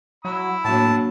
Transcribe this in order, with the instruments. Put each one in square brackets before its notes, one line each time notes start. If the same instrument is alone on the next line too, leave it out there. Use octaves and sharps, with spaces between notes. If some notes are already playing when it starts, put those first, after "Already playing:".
[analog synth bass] F#3 [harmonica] B5 E6
[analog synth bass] A2 [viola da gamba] F#3 A#3 D4 [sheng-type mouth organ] A5